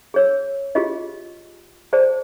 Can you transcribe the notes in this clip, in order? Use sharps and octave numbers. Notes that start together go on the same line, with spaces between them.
G#4 C#5 E6
F4 G4 G#4 D#5
G#4 C5 D5 A5